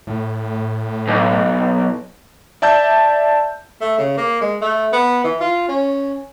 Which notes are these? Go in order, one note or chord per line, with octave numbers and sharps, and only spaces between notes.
A2
B1
D5 E5 A5 E6 G6
A3
C#3
A#3
G#3
A3
B3
E3
F4
C#4